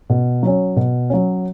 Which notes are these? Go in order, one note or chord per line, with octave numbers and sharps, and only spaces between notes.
B2
F#3 C#4
B2
F#3 C#4